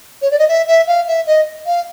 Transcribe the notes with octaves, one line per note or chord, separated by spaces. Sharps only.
C#5
D5
D#5
E5
E5
F5
E5
D#5
F5